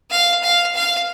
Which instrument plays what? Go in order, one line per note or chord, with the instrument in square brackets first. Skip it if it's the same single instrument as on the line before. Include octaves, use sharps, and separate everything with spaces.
[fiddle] F5
F5
F5